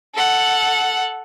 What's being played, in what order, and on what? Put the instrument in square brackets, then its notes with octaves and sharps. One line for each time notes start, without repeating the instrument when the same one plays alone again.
[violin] A4 F#5